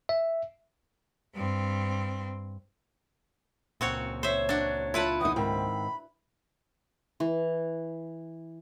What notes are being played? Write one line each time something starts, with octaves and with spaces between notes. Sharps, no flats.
E5
G2 C4
C#2 A#2 C4 F#4 C#5
C5 C#5 E5
D4 F#4
E4 F4 B4 F#5 A5
E2 D#4 D#6
G#2 D#3 C4 B5
E3